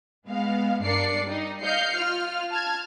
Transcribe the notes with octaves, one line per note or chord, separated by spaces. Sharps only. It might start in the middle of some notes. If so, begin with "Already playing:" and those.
G#3 B3 F5
G2 D4 A#4 D5 C7 C#7
G3 D#4
D#5 F5 G6 C7 C#7
F4 F6
A5 F6 G#6